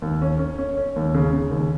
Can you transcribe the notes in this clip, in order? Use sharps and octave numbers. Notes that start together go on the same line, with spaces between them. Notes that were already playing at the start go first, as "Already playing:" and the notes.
D#2
C#4
C#4
C#4
C#4
D#2
C#3
C#3
D#2